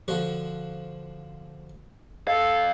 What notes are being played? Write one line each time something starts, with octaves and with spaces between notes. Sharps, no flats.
D3 F3 F#4
F2 A4 F5